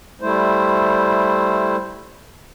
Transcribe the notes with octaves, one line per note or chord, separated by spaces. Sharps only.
G3 A3 E4 C5